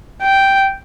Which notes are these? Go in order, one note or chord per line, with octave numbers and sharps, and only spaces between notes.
G5